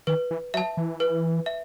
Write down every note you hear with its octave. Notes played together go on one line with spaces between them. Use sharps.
D#3 B4
E3
F#3 E5 A5
E3
B4
E5